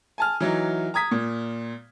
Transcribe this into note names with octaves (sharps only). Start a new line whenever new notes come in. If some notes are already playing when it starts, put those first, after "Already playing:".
G#5 A5 F6
E3 F#3 D#4
A#5 D#6 G#6 B6
A#2